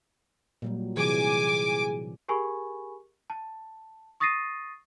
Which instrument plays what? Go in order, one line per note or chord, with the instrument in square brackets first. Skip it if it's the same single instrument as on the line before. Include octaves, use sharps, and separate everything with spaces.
[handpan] A#2 F#3 G3
[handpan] C3 E3 [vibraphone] G#4 [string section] G#5 D6
[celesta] G4 G#4 A#4 G#5 B5 C#6
A5
C#6 D#6 A6 A#6 C7 D#7